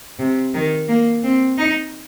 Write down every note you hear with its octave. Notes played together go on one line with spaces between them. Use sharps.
C3
D#3
A#3
C4
D#4